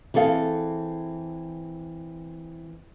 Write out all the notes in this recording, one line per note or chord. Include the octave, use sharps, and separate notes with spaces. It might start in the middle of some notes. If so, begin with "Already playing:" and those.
E3 C4 G#4 A4 F5